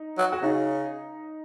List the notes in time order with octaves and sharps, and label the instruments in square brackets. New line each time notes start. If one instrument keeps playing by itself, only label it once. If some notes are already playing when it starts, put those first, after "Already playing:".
Already playing: [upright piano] D#4
[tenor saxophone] F#3
[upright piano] F#4
[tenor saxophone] C#3 [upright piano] D#4